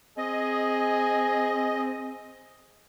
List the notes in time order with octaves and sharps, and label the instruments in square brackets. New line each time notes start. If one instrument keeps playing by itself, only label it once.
[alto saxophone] C4 [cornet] G#4 [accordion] D#5